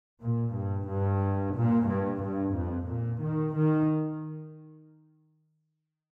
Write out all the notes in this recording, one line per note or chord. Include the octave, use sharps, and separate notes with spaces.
A#2
G2
G2
A#2
G2
G2
F2
A#2
D#3
D#3